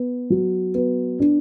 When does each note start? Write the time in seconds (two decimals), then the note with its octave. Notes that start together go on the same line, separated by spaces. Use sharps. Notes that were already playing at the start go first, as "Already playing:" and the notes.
Already playing: B3
0.30 F#3
0.75 B3
1.20 D4